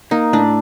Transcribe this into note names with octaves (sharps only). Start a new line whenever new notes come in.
A#3 D#4
A2 D4